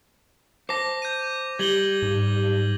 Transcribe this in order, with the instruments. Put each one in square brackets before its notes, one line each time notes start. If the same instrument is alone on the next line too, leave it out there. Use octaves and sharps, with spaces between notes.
[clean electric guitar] C5 A5 [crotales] D6 A#6
[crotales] G6 D#7
[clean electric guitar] G3 G4 [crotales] G#6 F#7 G7
[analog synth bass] G#2